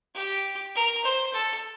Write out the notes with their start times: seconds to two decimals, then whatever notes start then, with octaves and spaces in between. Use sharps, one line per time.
0.15 G4
0.75 A#4
1.04 C5
1.33 A4